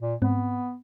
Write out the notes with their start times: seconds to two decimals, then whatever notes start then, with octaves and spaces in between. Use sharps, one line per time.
0.01 A#2
0.22 G#2 B3 C4